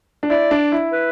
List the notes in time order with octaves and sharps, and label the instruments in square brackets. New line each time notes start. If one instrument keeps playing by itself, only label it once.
[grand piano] D4
[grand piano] E4 [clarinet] D5
[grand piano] D4
E4
[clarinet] B4